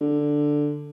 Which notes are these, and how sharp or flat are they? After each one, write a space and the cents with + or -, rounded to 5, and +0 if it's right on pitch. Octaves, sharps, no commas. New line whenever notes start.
D3 +5